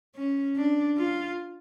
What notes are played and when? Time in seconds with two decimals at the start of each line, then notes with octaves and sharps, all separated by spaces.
0.16 C#4
0.56 D4
0.98 F4